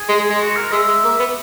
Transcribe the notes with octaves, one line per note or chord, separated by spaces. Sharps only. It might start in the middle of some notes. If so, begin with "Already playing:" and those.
Already playing: G#4
G#3
G#3
G#3
F#4
A#4
G#3 E5
G#3
A#3
B3